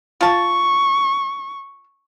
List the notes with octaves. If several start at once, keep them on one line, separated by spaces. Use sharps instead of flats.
F4 A5 C#6